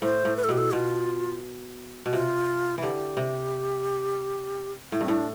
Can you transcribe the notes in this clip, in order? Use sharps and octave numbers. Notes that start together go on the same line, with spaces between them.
A2 C5
A2
B4
A4
B2 G4
A4
B2 F4
B2
C3 F4
D3 E3 G4
C3
A2 E4
G2 C4
A2 D4